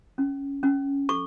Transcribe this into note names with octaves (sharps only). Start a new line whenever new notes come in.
C#4
C#4
A4 C#6